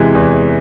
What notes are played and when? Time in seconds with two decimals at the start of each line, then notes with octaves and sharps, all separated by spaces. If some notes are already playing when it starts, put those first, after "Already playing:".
Already playing: E2 C3 E3 G#3
0.15 E2